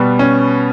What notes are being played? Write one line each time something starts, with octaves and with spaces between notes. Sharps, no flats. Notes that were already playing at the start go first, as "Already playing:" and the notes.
Already playing: B2 G3 B3
C#4